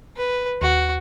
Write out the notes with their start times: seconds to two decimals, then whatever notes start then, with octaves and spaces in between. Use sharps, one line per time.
0.17 B4
0.62 D#2 F#4